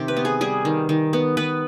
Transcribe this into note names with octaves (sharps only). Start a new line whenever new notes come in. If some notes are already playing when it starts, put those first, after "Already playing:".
Already playing: C3 D#3 G4
B4
B3
G#4
G3 G#4
D#3
D#3
B3
B3 B4